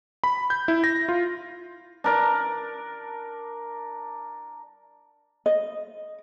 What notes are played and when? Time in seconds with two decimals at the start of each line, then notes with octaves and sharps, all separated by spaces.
0.24 B5
0.50 G6
0.68 E4
0.84 A#6
1.09 F4
2.04 D4 A#4 D5
5.46 D#5